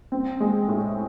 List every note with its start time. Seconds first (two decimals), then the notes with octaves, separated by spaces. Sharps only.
0.12 C4
0.40 G#3
0.68 A2